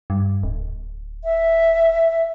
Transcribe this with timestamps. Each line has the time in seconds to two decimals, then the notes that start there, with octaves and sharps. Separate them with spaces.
0.10 G2
0.43 D1
1.24 E5